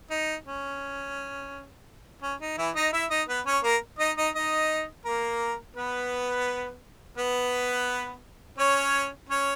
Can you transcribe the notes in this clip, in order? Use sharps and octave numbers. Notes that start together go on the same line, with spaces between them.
D#4
C#4
C#4
D#4
E3 E4
D#4 D#5
E4 E5
D#4 D#5
B3 B4
C#4 C#5
A#3 A#4
D#4 D#5
D#4 D#5
D#4 D#5
A#3 A#4
B3 B4
B3 B4
C#4 C#5
C#4 C#5